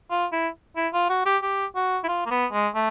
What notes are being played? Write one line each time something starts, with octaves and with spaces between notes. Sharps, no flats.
F4
E4
E4
F4
F#4
G4
G4
F#4
E4
F4
A#3
B3
G#3
A3